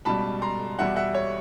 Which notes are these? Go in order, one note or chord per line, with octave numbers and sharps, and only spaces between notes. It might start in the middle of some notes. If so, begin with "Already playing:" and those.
C#2 B2 G3 A5 B5
A#5 C6
E2 B2 G3 E5 F#5
E5 F#5
C#5